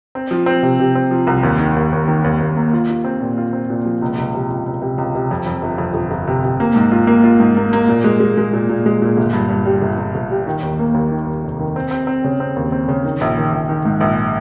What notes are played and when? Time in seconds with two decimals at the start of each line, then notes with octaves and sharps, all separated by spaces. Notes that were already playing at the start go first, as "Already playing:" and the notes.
0.15 C4
0.31 F3
0.46 C4
0.63 C3
0.79 C3
0.95 C4
1.11 F3
1.27 C2
1.43 D#2
1.60 D#3
1.76 D#2
1.93 D#2
2.08 D#3
2.24 D#2
2.40 D#2
2.57 A#3
2.73 F4
2.89 F4
3.04 C4
3.21 A#2
3.38 F4
3.53 C4
3.70 A#2
3.86 F3
4.02 C#2
4.18 C#2
4.34 C3
4.50 C#2
4.66 C#2
4.82 C3
4.98 C#2
5.15 C3
5.31 F2
5.46 F2
5.62 G1
5.78 F2
5.94 G1
6.11 G1
6.27 C3
6.44 C3
6.60 A#3
6.76 G#2
6.91 F4
7.07 A#3
7.24 F4
7.40 G#2
7.57 A#3
7.73 A#3
7.88 A#2
8.04 G#3
8.20 G#3
8.37 G#3
8.53 A#2
8.69 A#2
8.86 G#3
9.02 A#2
9.17 G1
9.33 G2
9.49 G2
9.65 G3
9.82 G1
9.98 G1
10.15 G1
10.31 G3
10.47 D#3
10.63 D#2
10.79 A#3
10.94 D#2
11.12 D#3
11.26 D#2
11.43 F1
11.60 D#3
11.76 C4
11.91 C4
12.07 C4
12.24 C#3
12.40 C4
12.56 D#2
12.72 C4
12.88 C#3
13.04 D#3
13.21 A#1
13.37 D#3
13.53 A#1
13.69 D#3
13.85 G#2
14.01 A#1